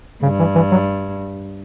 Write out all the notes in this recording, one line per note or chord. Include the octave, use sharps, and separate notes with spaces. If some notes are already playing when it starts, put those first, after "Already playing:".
G2 C#3
E3
E3
F#3